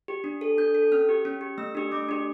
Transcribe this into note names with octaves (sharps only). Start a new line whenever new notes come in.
G4
D4
A4
D4 G6
A4
C#4 F6
G4
C#4
G4
A3 E6
D4 G4
A3 D6
D4 G4